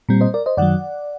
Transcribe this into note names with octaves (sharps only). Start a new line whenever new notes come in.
A#2 G3 C4
C5 D#5
A#4 D5
C5 D#5
F#2 D#3 F#3 D5 F#5